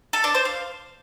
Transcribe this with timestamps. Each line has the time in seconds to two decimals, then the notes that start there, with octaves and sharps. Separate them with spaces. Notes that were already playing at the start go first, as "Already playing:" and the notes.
0.13 A4
0.24 D4
0.35 C5
0.45 F5